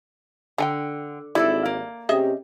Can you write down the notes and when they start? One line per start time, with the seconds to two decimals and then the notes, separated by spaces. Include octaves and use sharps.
0.58 D3 G5 G#5 A#5
1.35 G#1 G3 E4 A4 D5
1.65 A#3
2.09 C3 C#4 G4 G#4 D#5 E5